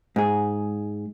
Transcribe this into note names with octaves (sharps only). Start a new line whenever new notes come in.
G#2 G#4